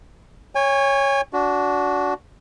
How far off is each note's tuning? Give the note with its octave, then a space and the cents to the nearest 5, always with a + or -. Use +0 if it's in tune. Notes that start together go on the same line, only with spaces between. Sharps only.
C#5 +0 G#5 -35
D4 -20 F#4 +0